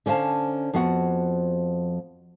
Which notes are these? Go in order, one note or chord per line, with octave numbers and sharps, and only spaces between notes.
D3 C#4 C5 F5 A5
F2 F3 B3 F#4 F#5